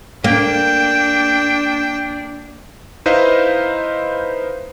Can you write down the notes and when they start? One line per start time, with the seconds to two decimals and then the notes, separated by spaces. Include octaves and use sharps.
0.24 A#3 D4 G5
3.06 D#4 E4 B4 C5 D#5 F5